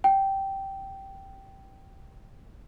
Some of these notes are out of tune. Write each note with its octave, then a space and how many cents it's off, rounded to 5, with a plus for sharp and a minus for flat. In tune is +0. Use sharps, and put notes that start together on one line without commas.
G5 -10